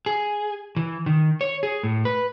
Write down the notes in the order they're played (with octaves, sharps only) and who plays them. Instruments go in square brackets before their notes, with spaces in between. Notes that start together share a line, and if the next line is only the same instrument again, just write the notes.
[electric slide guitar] G#4
E3
D#3
C#5
G#4
A2
B4